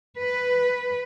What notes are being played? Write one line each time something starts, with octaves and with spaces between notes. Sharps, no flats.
B4